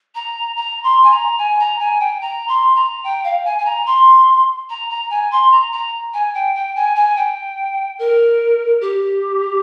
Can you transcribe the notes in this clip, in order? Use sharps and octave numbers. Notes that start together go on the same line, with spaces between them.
A#5
A#5
C6
G#5
A#5
G#5
A#5
G#5
G5
A#5
C6
A#5
G5
F5
G#5
G#5
A#5
C6
A#5
A#5
G#5
C6
A#5
A#5
G#5
G5
G5
G#5
G#5
G5
A#4
G4